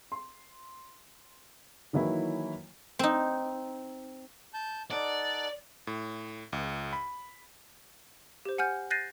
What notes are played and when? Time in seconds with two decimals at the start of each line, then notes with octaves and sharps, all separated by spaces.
0.12 C6
1.93 D#3 E3 F#3 A#3 E4 C#5
2.99 C4 D#4
4.54 A5 G6
4.90 D#4 A4 D5 F#5
5.87 A2
6.53 C#2
6.93 B5
8.45 G4 C5
8.58 F#5 G#5 F6 G6
8.91 F#6 G6 A6 A#6 C7 D#7